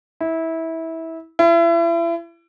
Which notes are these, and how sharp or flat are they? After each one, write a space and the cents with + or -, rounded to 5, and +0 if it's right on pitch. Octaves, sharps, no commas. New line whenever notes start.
E4 -20
E4 +35